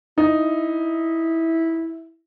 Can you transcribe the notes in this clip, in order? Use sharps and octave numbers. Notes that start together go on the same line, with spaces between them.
D#4 E4